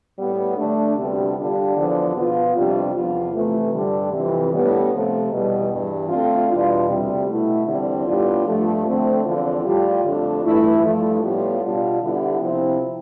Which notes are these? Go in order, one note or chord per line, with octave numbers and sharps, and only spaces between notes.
A2 G3 B3
D3 A3 D4
D2 C3 G3 B3 D4
D3 G3 D4 F4
E2 D3 F3
B2 B3 F4
F2 C3 G3 D4 F4
E2 C3 F3 B3 F4
C3 E3 A3
G2 D3 G3
F2 C3 E3
A2 G3 B3 D4
C3 F3 A3
E2 B2 G3
G2 E3 G3
D3 A3 C4 F4
E2 B2 G3 D4 F4
D2 C3 G3
B2 A3 E4
E2 D3 G3 C4 E4
A2 G3 B3 D4 F4
G2 F3 A3
D3 A3 C4
E2 D3 F3 C4 F4
A2 G3 D4 F4
F2 D3 A3 D4 F4
G2 E3 A3 E4
G2 F3 A3
A2 G3 B3 F4
B2 G3 D4 F4
D3 G3 B3 E4
C3 F3 C4 E4